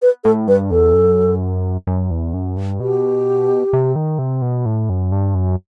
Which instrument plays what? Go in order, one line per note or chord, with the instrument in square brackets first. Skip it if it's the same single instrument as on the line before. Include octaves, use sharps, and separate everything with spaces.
[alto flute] B4
[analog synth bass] A2 [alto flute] A4
[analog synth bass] G2 [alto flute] B4
[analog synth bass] E2 [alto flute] A4
[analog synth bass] F#2
F#2
E2
F#2
G2
[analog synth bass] B2 [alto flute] G4
[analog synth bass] C3
D#3
C3
B2
A2
F#2
G2
F#2